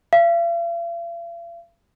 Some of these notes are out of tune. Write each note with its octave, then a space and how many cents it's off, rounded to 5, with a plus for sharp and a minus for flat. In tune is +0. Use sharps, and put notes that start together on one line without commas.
F5 -45